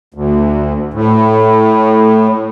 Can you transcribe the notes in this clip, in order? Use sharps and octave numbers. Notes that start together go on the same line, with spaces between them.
D2
A2